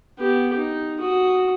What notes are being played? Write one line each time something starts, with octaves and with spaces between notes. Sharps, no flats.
B3 G4
D#4
F#4 D#6